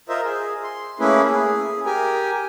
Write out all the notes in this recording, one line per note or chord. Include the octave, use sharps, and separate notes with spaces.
F4 A#4 C5 D#5 E5
G#4
C6
A3 A#3 C#4 E4 G#4 B4
G#4
G4 A#4 G#5